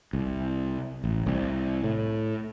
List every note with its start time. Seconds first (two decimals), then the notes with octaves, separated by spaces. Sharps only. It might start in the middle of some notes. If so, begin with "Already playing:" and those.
0.13 C2
1.04 A1
1.26 C2
1.83 A2